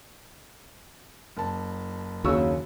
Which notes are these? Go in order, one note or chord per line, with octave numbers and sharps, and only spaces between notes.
F#1 A5
D#2 C#3 F#4 C#6 E6